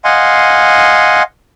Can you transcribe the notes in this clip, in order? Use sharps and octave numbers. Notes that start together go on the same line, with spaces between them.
D#5 F5 F#5 G#5 C6